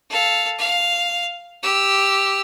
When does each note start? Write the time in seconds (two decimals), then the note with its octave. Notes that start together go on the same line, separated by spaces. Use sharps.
0.10 A4 F5
0.59 F5
1.63 G4 E6